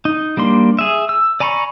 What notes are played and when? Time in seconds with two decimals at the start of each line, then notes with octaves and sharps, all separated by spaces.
0.05 D#4
0.37 G3 A#3 D4 C6
0.79 G#4 E5
1.09 E6
1.40 D5 G#5 A#5 B5 C#6